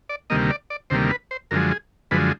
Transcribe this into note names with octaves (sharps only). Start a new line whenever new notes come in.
D5
D2 C3 D#3 G3 A#3 D#5
D5
D5
D2 C3 D#3 G3 A#3 C5
B4
C5
F#2 D3 F3 G#3 A#4
G#4
F#2 D3 F3 G#3 B4